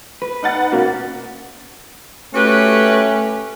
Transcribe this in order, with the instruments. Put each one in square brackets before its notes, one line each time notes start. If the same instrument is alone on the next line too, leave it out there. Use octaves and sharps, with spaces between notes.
[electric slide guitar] B4
[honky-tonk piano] D#4 F#5 A6
[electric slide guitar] B2 C#4 F#4 [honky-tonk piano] A#3
[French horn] A3 [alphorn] C#4 [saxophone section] F#4 G4 B4